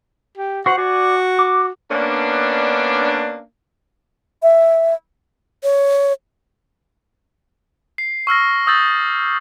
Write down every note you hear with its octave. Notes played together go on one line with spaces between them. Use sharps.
G4
F#4 C5 F#5
F#4 D5 G#5
D6
A#3 B3 C#4 D4
E5
C#5
C7
C#6 E6 F6 A#6
D#6 E6 G6 A6 F#7